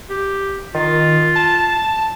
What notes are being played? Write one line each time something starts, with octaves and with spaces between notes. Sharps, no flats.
G4
D#3 F4
A5